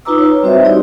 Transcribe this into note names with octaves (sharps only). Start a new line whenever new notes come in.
D#4 F4 B4 A#5 D6 E6
B4 C#5
G3 C4 F#4 C5 D#5 E5
C4 D#4 E4 G4 D5